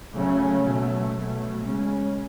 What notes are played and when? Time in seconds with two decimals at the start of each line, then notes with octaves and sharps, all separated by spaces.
0.14 C#3 F#3 A3 C#4
0.64 B2 F#3 A3
1.14 B2 F#3 A3
1.63 C#3 G#3 C#4